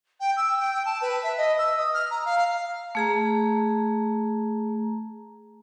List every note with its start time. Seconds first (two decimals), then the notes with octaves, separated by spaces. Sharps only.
0.20 G5
0.36 E6
0.59 G5
0.85 A5
1.02 B4
1.23 E5
1.37 D#5
1.58 E6
1.77 D#6
1.93 F6
2.11 A#5
2.25 F5
2.95 A3 G#4 A#5